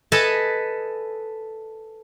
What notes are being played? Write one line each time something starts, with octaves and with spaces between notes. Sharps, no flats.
A4 B4 D#5 G#5 A5